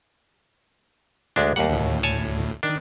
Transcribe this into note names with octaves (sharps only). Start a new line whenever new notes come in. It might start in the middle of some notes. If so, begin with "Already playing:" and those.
D2 G#3 D4
D#2 G3 A#3 F#5
D2 A2
C#5 G#5 A5
D#3 D4